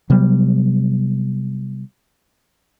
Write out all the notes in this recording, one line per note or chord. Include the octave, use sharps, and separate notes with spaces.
C3 F#3 G3 B3